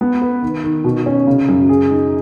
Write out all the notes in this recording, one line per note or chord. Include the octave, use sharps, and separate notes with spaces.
B3
B4
D#3
D#3
B2
C#4
C#3
F#2
G#4
D#4